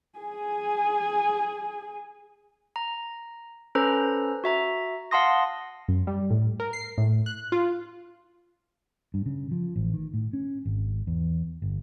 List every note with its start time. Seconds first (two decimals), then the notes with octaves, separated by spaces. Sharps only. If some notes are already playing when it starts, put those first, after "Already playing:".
0.19 G#4 G#5
2.76 A#5
3.75 C#4 A4 B4 C5 A#5
4.44 F#4 E5 A#5
5.11 F5 F#5 A5 C6 D#6 A#6
5.88 F#2
6.07 G3
6.30 A2
6.60 A#4
6.73 C7
6.98 A2
7.26 F#6
7.52 F4
9.14 G2
9.26 C#3
9.51 F3
9.76 A1
9.93 D#3
10.14 A2
10.33 C#4
10.65 G#1
11.07 E2
11.62 G1